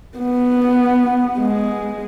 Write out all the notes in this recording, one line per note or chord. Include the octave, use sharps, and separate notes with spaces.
B3
G#3